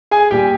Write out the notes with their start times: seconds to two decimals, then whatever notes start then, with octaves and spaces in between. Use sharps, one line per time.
0.11 G#4 G#5
0.31 A#2 G3 G4 G5